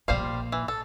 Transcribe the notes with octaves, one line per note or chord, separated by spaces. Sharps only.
A#1 A#2 G3 C5 F5
E3
A4